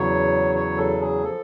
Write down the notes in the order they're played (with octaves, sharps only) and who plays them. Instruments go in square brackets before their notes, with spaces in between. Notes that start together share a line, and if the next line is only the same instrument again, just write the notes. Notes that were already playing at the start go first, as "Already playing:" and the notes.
Already playing: [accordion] E2 C#3 F#3 C#5
C#5
A4
G#4
F3 A4